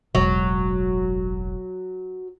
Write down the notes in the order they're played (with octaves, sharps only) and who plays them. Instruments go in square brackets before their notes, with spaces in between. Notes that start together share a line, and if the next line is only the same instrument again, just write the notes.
[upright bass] E1 A1 [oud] F#3